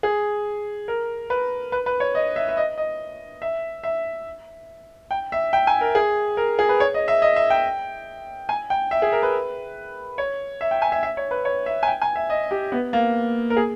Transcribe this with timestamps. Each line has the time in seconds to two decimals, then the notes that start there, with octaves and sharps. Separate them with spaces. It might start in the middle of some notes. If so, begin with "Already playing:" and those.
0.03 G#4
0.88 A#4
1.30 B4
1.72 B4
1.86 B4
2.00 C#5
2.15 D#5
2.36 E5
2.49 E5
2.57 D#5
2.78 D#5
3.42 E5
3.83 E5
5.11 G5
5.32 E5
5.53 G5
5.67 G#5
5.81 A#4
5.95 G#4
6.37 A#4
6.59 G#4
6.69 B4
6.80 C#5
6.94 D#5
7.08 E5
7.22 D#5
7.36 E5
7.50 G5
8.49 G#5
8.70 G5
8.91 E5
9.02 G#4
9.12 A#4
9.23 B4
10.18 C#5
10.61 E5
10.71 G5
10.82 G#5
10.92 E5
11.03 E5
11.17 C#5
11.31 B4
11.45 C#5
11.66 E5
11.83 G#5
11.88 G5
12.02 G#5
12.16 E5
12.30 D#5
12.51 G4
12.72 B3
12.93 A#3
13.50 A#4
13.57 G#4